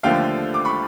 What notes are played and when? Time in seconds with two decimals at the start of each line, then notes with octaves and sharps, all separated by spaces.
0.03 D#2 D3 F3 A3 F5 G5
0.54 D6
0.65 B5 C#6